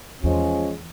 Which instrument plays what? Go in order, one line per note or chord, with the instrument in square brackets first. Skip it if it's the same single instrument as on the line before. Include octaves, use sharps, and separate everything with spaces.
[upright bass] E2 [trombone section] F3 G#3 C#4